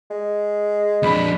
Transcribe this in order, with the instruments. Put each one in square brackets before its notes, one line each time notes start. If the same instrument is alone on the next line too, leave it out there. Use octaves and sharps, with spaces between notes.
[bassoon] G#3
[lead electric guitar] F2 D4 [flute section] B5